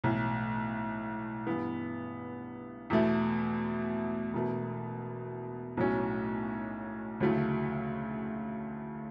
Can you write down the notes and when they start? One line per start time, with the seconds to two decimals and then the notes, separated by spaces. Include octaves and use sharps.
0.04 B1 A2 E3
1.47 G2 E3 B3
2.90 E2 B2 A3 E4
4.33 E1 E2 B2 A3
5.77 B1 A2 F#3 C#4
7.20 D2 C#3 F#3 A3 E4